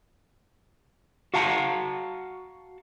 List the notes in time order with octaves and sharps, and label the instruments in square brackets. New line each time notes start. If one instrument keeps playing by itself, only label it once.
[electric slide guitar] F#4 F5 F#5 A5 A#5